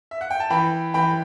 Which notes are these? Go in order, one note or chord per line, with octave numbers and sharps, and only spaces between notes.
E5
F#5
G5
A5
E3 G5 B5
E3 G5 B5